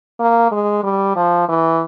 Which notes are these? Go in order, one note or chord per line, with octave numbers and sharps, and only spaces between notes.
A#3
G#3
G3
F3
E3